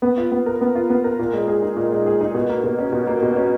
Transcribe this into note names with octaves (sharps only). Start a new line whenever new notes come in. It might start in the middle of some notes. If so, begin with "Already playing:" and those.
B3
F4
B3
A#4
B3
F4
B3
A#4
A#2
G#3
G#4
D#4
A#2
G#3
G#4
D#4
B2
A#3
B2
C#4
B2
A#3
B2
C#4